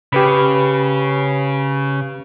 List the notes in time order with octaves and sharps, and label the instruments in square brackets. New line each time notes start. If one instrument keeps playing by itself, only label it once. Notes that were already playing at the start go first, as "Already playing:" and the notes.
[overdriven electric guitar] C#3 [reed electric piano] G4 B4 B5